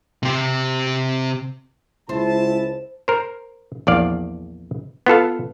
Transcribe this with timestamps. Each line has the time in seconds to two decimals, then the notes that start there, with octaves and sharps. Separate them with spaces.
0.23 C3 G4
2.09 C#2 E4 C5 A5
3.08 A#4 C5
3.87 A#1 E2 D5 F5
5.06 B3 F4 A4 F5